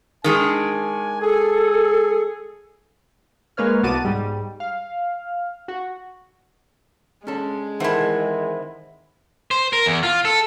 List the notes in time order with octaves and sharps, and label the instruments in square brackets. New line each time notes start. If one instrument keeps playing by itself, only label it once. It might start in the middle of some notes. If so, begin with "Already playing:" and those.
[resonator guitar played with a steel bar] D#3 G#3 D4 [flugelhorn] G#5
[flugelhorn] G#4 [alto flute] A4
[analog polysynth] G#3 A#3 B4 C#5 F6
C2 B3 F#4 A5 D6 D#7
G#2 G3
F5
F#4
[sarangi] G#3 [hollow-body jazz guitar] C#4 D4 A4
[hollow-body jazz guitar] D#3 E3 A4 [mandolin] C4 E4 [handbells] A#4 E5 F#5
[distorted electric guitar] C5
A#4
E2
F4
A4